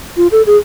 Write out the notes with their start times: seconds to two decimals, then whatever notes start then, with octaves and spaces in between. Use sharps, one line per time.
0.17 F4
0.32 A4
0.47 G#4